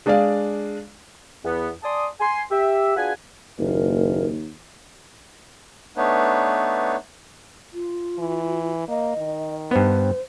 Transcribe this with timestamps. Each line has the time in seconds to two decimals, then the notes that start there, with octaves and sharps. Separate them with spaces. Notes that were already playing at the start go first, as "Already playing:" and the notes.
0.06 G#3 D4 G#4 D5 F5
1.45 E2 B3
1.83 D5 G#5 A5 C6 D#6
2.20 G#5 C6
2.50 G4 E5
2.96 D4 F4 F#4 G#4 B4 G#5
3.59 F#1 D#2 A#4
5.97 A3 B3 D4 D#4 B4 C#5
7.73 F4
8.19 E3
8.89 A#3 D#5
9.17 D#3
9.71 G2 B3 C5